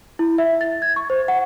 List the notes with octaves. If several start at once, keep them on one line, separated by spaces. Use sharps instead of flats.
E4
E5
A6
G#6
C#6
C5
F#5